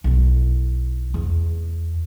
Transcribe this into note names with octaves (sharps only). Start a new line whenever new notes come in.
B1 E4
E2